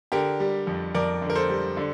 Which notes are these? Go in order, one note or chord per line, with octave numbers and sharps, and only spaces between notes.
D3 G4 A#4
G3
F2
F2 A#4 D5
D3
A#4
A4 C5
G3
D3